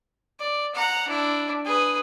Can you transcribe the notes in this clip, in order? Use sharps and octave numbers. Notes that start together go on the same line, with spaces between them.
D5
F#5 A#5
D4 E4
G#4 B4